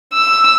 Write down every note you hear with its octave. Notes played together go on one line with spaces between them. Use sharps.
E6